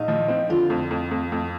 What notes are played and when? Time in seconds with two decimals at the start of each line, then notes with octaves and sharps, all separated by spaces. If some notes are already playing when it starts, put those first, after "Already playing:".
Already playing: A#1 D#4
0.08 F3
0.28 C4
0.49 D3 F4
0.70 F2
0.91 F2
1.11 F2
1.32 F2